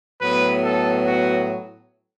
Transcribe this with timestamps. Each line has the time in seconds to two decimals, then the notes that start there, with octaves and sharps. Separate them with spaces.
0.22 A2 F#3 B3 B4
0.63 A4
1.05 F#4